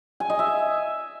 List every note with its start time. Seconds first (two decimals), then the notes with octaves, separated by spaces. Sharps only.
0.20 G#5
0.30 D#5
0.39 E5